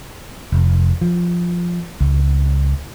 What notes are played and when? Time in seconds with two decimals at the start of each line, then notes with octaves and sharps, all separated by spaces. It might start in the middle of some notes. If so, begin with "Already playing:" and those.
0.52 F1
1.01 F3
2.00 C#2